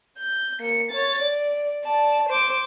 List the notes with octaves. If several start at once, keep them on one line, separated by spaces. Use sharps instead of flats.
G6
A#3 C#7
C#5 A6
D5
D5 A5
C5 D6